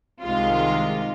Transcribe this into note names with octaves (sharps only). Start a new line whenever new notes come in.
C2 C3 D#3 G#3 F4